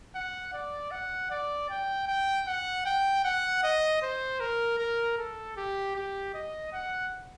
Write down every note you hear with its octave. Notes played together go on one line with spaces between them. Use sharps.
F#5
D5
F#5
D5
G5
G5
F#5
G5
F#5
D#5
C5
A#4
A#4
A4
G4
G4
D#5
F#5